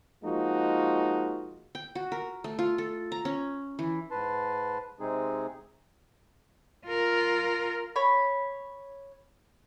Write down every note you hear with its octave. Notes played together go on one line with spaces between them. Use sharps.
F3 G#3 A#3 D#4 F4 F#4
G5
F#4
A#4
A3
F4
A4
A#5
C#4
E3
G#2 B4 A5 C6
C3 G#3 C4 D#4 G#4
F4 A#4
C#5 B5